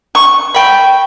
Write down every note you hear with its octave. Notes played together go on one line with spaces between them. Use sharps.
C#6
G5 B5